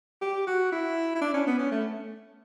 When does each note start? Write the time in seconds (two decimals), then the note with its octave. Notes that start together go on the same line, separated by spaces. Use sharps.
0.21 G4
0.47 F#4
0.72 E4
1.15 E4
1.21 D4
1.34 C#4
1.47 B3
1.59 C#4
1.71 A3